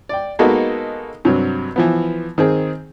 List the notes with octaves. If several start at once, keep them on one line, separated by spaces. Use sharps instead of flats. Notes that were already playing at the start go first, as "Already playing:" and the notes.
D5 G5
G#3 A#3 B3 D#4 F#4 A4
G2 C3 F#3
E3 F3 B3
D#3 C4 G#4